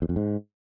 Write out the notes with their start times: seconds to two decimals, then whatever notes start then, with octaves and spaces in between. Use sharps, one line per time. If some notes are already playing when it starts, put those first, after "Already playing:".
0.02 E2
0.09 F2
0.16 G#2